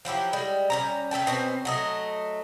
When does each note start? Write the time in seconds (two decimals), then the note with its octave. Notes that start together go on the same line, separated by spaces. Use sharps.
0.05 F3 F#3 E4 G4
0.33 G3 G#3
0.70 G3 C#4 A#5
1.11 C#4 E5 G5 A5
1.27 B2 C4 C#4
1.65 F#3 A3 D#5